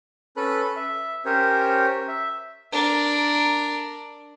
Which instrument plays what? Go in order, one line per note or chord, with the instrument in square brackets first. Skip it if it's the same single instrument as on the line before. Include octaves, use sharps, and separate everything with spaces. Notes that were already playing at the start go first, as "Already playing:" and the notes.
[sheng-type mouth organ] C#4 A4 B4 B5 F#6
E5
C#4 G4 A#4 C5 C#5
E5
[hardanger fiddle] D4 A#4